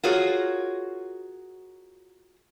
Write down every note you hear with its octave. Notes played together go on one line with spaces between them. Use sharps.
F4 F#4 G#4 A#4 C#5